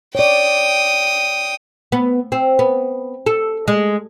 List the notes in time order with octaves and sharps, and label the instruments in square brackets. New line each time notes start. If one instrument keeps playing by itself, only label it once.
[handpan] C#5 D5 [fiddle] G5 D#6
[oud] B3
C4
B3
A4
G#3